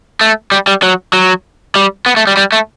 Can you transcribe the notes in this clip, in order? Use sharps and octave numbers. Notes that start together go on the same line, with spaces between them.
A3
G3
G3
F#3
F#3
G3
B3
A3
G3
G3
A3